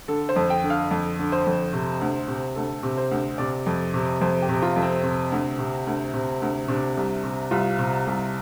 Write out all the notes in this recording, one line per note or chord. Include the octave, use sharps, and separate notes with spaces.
D3 A4
C5
F2
G5
D3
F5
F2
D3
C5
F2
C3
D2
C3
D2 A4
C3
C5
D2
C3 D5
F2
C3
F2 C5
G4
C3
F4
F2
C4
C3
D2
C3
D2
C3
D2
C3 D4
C2
C3
C2 F4
C3
C2